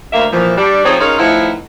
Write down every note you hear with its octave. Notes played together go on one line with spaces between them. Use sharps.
D2 A#3 E5
A#2 E3 F3
G3 D4
F3 C4 D#4 G#4 C#5
C#4 D#4 F4 G#4 A#4 C#5
A2 F3 B3 D#4 E4